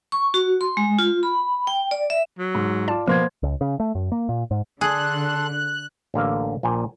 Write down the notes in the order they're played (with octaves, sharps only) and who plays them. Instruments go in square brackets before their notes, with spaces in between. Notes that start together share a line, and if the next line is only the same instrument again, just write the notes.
[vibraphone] C#6
F#4
C6
G#3
F4
B5
G5
D5
E5
[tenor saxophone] F#3
[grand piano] G#2
[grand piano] F4 D6 [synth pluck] D5 A5
[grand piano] B2 [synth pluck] F3 [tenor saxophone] A#3 [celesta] C5 C6 G#6
[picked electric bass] C#2
C#3
A3
F#2
A#3
A#2
G#2
[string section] D3 [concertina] D4 A4 C6 [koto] G#4 [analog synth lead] F#6
[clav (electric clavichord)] A1 D3 A#3 F5
A#1 A#2 G5 G#5